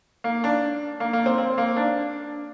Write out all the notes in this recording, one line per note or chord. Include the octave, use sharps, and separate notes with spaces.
A#3
D4
A#3
A#3
C4
C4
A#3
D4